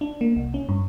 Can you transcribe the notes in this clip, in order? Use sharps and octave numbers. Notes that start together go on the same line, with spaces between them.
D4
A#3
C2
C#4
G2